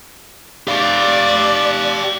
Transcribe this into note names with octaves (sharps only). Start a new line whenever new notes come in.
G4 D5 F5